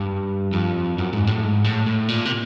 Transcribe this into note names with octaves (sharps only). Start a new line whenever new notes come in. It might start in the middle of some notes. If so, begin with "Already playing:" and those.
Already playing: G2
F2
F#2
G#2
A2
G#2
A2
A2
A#2
C3